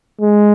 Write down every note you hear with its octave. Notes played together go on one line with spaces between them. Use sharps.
G#3